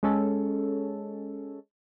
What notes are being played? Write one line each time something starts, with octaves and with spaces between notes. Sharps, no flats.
G#3 C#4 A4